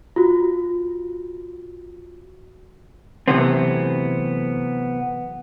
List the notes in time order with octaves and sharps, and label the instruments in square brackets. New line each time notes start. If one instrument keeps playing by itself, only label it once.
[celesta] F4 F#4
[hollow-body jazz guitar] C3 E3 F#3 A3 B3 C4